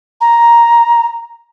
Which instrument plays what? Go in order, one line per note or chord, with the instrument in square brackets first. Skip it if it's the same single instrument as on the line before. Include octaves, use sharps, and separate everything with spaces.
[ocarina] A#5